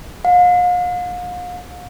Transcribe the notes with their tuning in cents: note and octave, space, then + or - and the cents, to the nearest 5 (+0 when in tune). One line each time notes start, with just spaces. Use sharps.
F5 +40